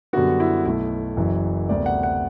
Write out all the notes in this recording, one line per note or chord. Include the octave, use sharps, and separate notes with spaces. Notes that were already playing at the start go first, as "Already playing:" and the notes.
F#2 D3 G3 B3 F#4
E4
B1 B2 A3 E4
F#1 F#2 E3
D2 C3 G3 B3 D5
F#5
F#5